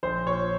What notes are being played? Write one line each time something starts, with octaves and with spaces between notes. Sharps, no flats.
A#1 C5
A#2 C#5